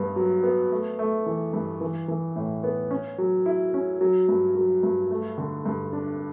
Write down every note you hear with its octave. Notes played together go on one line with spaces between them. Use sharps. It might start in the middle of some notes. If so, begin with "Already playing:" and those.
Already playing: G2 B3
F#3
B3
A3
A3
E3
G2
E3
E3
A2
B3
C#4
F#3
E4
C#4
F#3
G2
F#3
G2
A3
D3
G2
D4